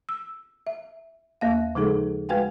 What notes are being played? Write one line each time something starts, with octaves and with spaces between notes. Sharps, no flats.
E6
E5
D#2 A#3 F5
C#3 F3 G#3 D#4 G#4 A4
G#3 F#4 B4 F5 G5 G#5